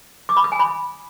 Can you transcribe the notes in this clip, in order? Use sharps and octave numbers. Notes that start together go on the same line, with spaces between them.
D6
B5
D#6
G#5
B5